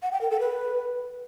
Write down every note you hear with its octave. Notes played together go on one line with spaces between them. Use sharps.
F#5
G5
A#4
A4
B4